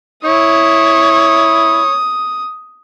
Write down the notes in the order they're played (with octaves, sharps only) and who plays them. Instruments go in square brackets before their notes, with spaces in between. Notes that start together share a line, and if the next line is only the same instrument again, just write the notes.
[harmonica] E4 [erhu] C#5 [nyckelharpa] D#6